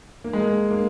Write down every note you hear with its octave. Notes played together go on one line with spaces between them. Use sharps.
A#3
G#3
A#3
A#3